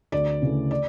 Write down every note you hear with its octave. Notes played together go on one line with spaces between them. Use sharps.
D2 D5
C#3 E3 A3
D5